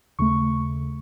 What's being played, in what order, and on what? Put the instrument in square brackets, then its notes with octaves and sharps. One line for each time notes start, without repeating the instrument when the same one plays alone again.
[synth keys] D#2 C#3 A3 C#6